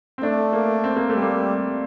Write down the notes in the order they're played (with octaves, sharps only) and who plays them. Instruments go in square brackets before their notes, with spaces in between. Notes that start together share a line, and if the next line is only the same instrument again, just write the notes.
[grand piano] C4
[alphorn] A3 [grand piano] D4
[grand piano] A#3
C4
A#3
[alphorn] G3 [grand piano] A3
[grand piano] A#3